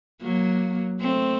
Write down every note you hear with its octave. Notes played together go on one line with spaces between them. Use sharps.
F#3 A#3
A3 C4